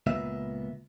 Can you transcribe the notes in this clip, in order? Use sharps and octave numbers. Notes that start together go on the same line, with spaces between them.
C#2 A#2 B3 E5